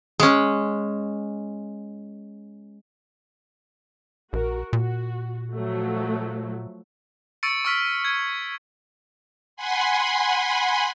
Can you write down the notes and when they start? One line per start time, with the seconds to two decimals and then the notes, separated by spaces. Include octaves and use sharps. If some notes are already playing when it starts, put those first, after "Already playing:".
0.20 G#3 C#4
4.33 A#1 F#4 A#4
4.73 A#2 F#4
5.54 F3 F#3 A3
7.43 C#6 E6 A6 C#7 D7
7.65 C#6 E6 F6 B6
8.05 G#6
9.57 F#5 G#5 B5 C6